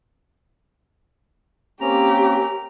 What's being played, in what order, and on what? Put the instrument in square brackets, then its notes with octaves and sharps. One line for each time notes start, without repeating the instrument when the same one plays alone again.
[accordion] A#3 C4 C#4 [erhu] G4 [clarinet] A#5